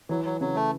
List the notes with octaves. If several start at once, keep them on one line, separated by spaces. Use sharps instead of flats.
E3 F#3
F#3
C#3 F#3
A3